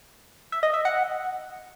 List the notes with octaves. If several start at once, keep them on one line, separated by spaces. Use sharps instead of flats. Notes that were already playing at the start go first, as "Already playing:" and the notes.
E5
D#5
E5
F#5